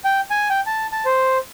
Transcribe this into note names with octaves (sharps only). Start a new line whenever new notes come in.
G5
G#5
G5
A5
A5
C5